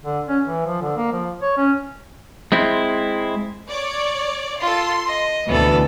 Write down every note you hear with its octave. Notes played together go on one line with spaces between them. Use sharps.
D3
C#4
E3
F3
D3
A#3
F3
C#5
C#4
G#3 C4 E4
C#5 D5
F4 A4 C6
D#5
D2 B2 E3 B3 A4